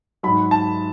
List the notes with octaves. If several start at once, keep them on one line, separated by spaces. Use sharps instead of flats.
G#2 F#3 B5
A5